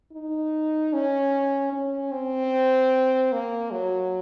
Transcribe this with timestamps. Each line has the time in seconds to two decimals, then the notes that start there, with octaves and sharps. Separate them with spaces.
0.12 D#4
0.93 C#4
1.72 C#4
2.12 C4
3.32 A#3
3.71 F#3